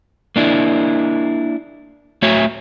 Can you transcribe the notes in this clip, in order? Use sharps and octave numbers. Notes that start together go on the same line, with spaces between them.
A#3 D4 E4
A3 F#4 C#5 E5